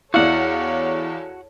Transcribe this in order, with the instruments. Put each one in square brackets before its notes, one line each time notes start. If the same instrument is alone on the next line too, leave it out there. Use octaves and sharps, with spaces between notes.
[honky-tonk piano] E2 D5 F5 [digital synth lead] E4 [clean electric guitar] F#4 F#5 [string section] A4 C#5